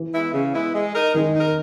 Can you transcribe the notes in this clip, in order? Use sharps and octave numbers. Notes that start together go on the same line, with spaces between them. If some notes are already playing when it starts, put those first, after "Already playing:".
Already playing: E3
G#3 B3 E4
C#3
G#3 B3 E4
G#3
D#4 A#4
D#3 G#3
D#4 A#4